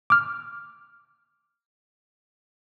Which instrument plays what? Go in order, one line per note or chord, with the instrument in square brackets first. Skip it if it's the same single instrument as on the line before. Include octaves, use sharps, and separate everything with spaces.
[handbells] D6 F6